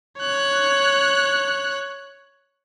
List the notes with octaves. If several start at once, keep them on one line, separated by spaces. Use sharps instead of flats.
C#5 F#6